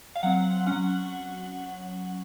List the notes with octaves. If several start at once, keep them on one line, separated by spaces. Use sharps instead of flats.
F5
F#3 C4 F#5
F#3 C#4 F#5